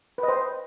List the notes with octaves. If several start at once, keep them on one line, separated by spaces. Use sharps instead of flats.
B4
D#5
C5